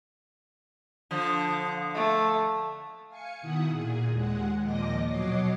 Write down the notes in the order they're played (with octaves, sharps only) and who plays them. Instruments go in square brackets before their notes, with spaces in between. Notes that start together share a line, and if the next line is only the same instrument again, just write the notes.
[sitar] D3 F3
[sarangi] A3
[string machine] F5 G#5 C#7
B2 D#3 E4 F#5 D#6
A#2 G#4
D#2 G#3 F#5
D#2 A#2 F3 D#5 D6 A#6
B2 F#3 C#5 D#5 D6 C7